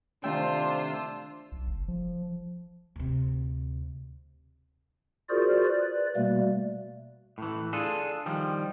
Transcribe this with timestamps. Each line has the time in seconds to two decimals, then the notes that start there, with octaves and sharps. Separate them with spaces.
0.24 C3 D#3 A3 D4 F4 C5 G5 E6
1.52 B1
1.68 F#1
1.88 F3
2.96 D2 C3
5.29 F4 F#4 G#4 A#4 C5 D5
5.67 B4 D5
6.16 B2 G3 A3 A#3
7.38 A2 E3
7.73 D4 F4 G#4 A4
8.26 D#3 F3 G3